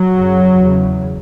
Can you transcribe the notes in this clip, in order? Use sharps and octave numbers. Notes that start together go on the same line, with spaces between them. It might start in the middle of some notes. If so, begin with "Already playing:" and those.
Already playing: F#3
F#2 C#3
E2 C#3